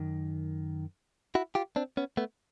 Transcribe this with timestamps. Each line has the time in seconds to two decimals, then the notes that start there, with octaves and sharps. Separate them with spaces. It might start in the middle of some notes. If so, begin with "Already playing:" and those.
Already playing: F#2 D#3
1.35 E4 F#4
1.55 F4 G4
1.76 C4 D4
1.97 B3 C#4
2.17 A3 B3